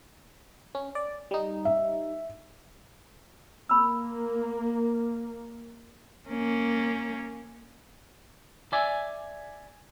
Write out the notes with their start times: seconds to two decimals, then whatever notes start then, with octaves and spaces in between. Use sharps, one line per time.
0.75 C#4
0.95 D5
1.31 G3 D#4
1.65 E5
3.69 A#3 B5 E6
6.29 A#3 C#4
8.73 D5 E5 G#5